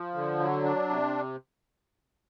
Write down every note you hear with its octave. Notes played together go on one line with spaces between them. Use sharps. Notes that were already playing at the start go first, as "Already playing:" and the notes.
Already playing: F3
D3
F#3
D4
C3